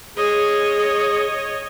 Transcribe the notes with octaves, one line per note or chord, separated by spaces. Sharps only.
G#4 C#5 D#5